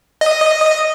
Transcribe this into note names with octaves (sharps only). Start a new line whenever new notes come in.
D#5